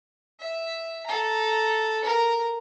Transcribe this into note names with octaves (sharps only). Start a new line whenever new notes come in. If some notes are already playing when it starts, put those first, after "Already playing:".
E5
A4 A#5
A#4